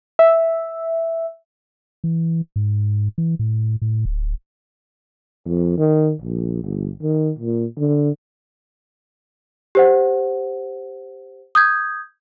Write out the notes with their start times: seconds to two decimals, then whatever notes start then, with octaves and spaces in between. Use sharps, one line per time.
0.19 E5
2.04 E3
2.56 G#2
3.18 E3
3.39 A2
3.82 A2
4.05 D1
5.46 F2
5.78 D#3
6.21 A#1
6.63 G1
7.02 D#3
7.39 A#2
7.78 D3
9.75 G4 C5 F#5
11.55 D#6 G6 G#6